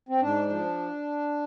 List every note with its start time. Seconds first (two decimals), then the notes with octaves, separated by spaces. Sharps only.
0.09 C4
0.21 G#2 D4
0.49 F3